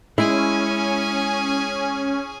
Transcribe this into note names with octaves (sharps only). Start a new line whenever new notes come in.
G#3 C#4 E4 G#4 G#5